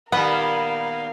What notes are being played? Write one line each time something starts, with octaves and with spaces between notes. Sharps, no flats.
A#2 D#3 G3 B3 A#4 F5 F#5